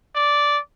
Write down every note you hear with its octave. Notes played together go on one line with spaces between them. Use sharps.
D5